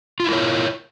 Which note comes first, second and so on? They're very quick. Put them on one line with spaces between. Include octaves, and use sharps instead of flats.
F4 E4 A#4 C#5